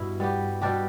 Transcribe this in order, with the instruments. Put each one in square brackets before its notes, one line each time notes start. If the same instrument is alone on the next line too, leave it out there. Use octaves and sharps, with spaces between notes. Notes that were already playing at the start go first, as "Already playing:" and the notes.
Already playing: [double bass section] G2 [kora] B2 E4
[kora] G3 B3 G4
B2 G3 D4 G4